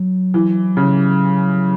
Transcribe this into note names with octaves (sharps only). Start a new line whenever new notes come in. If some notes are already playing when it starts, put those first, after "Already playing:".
Already playing: F#3
E3
C#3